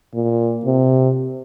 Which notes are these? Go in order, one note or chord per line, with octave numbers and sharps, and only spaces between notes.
A#2
C3